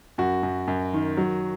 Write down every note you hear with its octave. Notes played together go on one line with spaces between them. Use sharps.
F#2 F#4
F#2
F#2
D#3
F#3